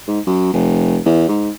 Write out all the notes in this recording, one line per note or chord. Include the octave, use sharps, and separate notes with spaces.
G#2
F#2
F1
E2
G#2